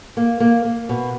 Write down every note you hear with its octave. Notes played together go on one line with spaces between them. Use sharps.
A#3
A#3
A#3
B2